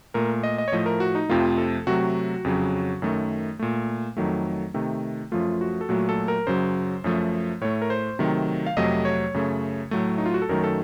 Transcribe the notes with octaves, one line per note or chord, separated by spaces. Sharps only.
A#2 A3 A#4
D#5
D#5
C#5
A2 F3 A3 D#5
A#4
F#4
D#4
F2 C3 F3 A3 F4
A4
C3 F#3 A3 F#4
F2 C#3 F#3
F#2 D#3 A3
A#2 A3
F2 D#3 F#3 A3
C3 D#3 A3
F#2 F3 A3 F4
F#4
A4
A#2 F#3 A3 F#4
A4
A#4
F#2 C#3 F#3 C5
F#2 F3 A3
A2 A3 C#5
A#4
C5
C3 D#3 F#3 A3
F5
F2 C3 F#3 A3 D#5
C#5
F#2 C#3 A3
A2 F#3 A3
D#4
F4
F#4
A4
F#2 D#3 F#3 A3 A#4
A4